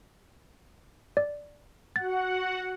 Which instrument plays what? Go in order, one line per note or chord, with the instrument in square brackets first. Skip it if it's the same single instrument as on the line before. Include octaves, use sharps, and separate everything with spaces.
[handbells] D5
[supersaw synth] F#4 F#5 [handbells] A6